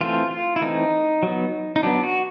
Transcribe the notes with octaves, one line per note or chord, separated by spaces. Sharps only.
E3 A3 C4 F4
F4
E4
E3 A3 C4 D#4
F#3 B3
D#4
F#3 B3 D4
F#4